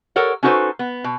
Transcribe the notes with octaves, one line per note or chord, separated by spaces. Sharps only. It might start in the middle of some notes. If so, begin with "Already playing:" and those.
A4 A#4 C#5 F#5
C#4 D#4 F#4 A4 B4 C5
B3
B2